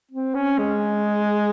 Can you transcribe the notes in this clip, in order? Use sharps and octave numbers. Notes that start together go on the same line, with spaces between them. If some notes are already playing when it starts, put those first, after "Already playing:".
C4
C#4
G#3